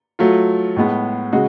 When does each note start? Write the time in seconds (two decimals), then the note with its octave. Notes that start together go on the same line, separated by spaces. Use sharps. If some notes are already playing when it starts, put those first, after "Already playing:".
0.19 F#3 A3 F4
0.76 A2 G#3 B3
1.33 C#3 G#3 F#4